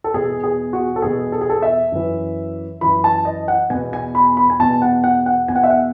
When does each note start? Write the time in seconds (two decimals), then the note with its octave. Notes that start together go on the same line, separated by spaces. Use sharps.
0.04 A4
0.14 E2 B2 G#4
0.44 G#4
0.73 F#4
0.96 A4
1.02 E2 B2 G#4
1.32 A4
1.41 G#4
1.50 A4
1.62 E5
1.92 F#2 E3
2.81 F#2 E3 B5
3.04 A5
3.25 D#5
3.48 F#5
3.70 E2 B2 G#5
3.93 G#5
4.15 B5
4.37 B5
4.50 G#5
4.59 E2 B2 A5
4.82 F#5
5.04 F#5
5.26 F#5
5.48 E2 B2 G#5
5.56 F#5
5.64 E5
5.70 F#5